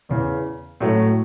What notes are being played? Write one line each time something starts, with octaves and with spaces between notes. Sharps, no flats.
E2 C#3 E3
A2 F#3 A3